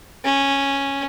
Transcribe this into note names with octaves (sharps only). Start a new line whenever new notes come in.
C#4